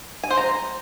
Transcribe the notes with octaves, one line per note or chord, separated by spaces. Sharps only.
G#5
C5
A#5